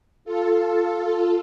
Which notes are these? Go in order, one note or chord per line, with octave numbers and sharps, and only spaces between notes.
F4 A4